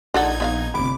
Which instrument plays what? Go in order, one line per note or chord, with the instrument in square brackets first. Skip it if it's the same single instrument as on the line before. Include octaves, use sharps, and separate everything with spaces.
[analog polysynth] A#1 D#4 G#6 [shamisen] D4 A4 F#5
[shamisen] B3 E5 F5
[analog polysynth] G1 D6 [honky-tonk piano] C3 B5